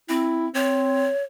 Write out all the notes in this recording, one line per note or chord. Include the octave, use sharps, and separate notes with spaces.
C4 E4
C4 C#5